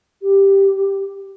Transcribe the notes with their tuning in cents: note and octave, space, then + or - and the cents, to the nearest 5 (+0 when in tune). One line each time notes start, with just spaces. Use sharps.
G4 +0